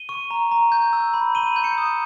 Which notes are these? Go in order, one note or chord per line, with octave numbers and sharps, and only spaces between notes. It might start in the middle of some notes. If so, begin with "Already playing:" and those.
Already playing: D#7 G7
C#6
A#5
A#5
G6
E6
B5
B5 D#7 G7
G6
C#7 E7
D#6